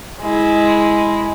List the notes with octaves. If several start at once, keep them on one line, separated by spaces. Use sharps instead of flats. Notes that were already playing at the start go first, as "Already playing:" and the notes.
G#3 E4